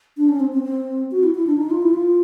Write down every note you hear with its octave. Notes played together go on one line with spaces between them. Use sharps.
D4
C#4
C4
C4
C4
F#4
E4
E4
D4
D#4
F4
E4
F4